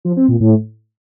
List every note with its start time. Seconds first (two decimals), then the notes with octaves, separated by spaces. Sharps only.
0.05 F3
0.16 C4
0.28 A#2
0.40 A2